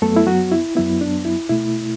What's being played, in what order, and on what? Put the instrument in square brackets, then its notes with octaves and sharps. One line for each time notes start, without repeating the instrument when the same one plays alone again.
[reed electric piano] F#2 F#3 A3 B3 A4
E4
F#3 F#4
E4
F#2 F#3 B3 E4
D4
E4
B2 A3 E4